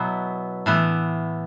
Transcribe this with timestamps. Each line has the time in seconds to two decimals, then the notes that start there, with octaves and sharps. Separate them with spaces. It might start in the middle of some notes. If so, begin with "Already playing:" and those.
Already playing: B2 F#3 B3 E4
0.66 A2 E3 B3